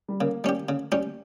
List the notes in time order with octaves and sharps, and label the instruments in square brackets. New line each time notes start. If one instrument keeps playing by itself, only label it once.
[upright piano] G3
[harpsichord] C#3 [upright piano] A#3
[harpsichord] G3 C#4 G4
C#3
G3 C#4 G4